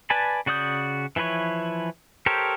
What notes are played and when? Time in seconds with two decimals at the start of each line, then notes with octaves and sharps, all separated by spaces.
0.10 B4 D5 G#5 A5 B5
0.46 C#3 F#4 D5 D#6 G6
1.16 E3 F3 E4 B4 C#5
2.26 G4 A4 A#4 C5 C#5